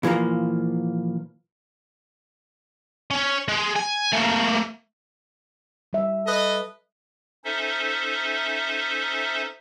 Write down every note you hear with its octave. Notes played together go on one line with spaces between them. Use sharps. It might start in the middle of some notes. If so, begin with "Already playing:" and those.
A#2 E3 F3 A#3
C#4
G#3
G#5
A3 A#3
G3 E5
A4 B4 D#5
C#4 D#4 A4 C5 E5